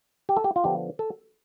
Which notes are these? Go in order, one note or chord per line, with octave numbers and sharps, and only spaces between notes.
G4
A4
G4
F4
D3 F3 B3 D4 G4
A4